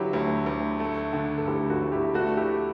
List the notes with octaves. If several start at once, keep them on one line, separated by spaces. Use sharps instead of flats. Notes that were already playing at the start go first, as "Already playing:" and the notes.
Already playing: D3 F#3 E4 G4
D2
D2
A3
D3
A4
D2 E4 G4
F#4 A4
D2
E4 G4
A3 D4 F#4
E4 G4